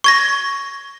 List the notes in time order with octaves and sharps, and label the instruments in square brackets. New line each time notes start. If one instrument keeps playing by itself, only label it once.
[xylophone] C#6 G#6 A#6